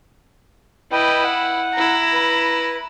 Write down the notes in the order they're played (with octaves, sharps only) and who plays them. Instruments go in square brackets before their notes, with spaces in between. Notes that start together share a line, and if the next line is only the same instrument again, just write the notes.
[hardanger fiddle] E4 [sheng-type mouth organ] B4 D#5 G5
[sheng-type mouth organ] F#5
[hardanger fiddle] E4 A#5
[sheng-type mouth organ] B4